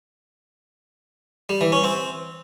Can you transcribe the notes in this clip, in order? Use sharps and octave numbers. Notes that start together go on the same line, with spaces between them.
G3
E3
C#4
C4